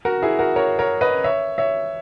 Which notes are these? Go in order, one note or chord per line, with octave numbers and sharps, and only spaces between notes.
F#4 A#4
E4 G#4
F#4 A#4
A#4 C#5
A#4 C#5
B4 D#5
C#5 E5
C#5 E5